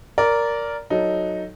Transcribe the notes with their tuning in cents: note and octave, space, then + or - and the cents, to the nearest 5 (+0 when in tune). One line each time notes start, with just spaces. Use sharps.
A#4 +0 D5 -15
F#3 +0 D#4 +0 A4 +0